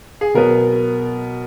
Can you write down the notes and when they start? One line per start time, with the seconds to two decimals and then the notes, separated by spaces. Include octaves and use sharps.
0.21 G#4
0.34 B2 F#3 B3 A#4